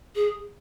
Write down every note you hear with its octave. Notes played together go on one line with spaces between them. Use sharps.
G#4